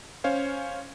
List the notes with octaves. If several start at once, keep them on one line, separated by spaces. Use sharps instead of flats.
C#4 C5 C#5 F5